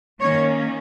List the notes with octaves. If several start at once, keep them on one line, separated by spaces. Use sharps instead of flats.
D#3 A#3 C#4 C#5